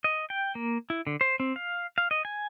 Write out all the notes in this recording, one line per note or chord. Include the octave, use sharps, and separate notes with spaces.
D#5
G5
A#3
E4
D3
C5
C4
F5
F5
D#5
G#5